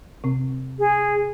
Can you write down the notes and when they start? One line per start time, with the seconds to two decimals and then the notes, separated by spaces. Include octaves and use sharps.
0.24 C3 C4
0.79 G#4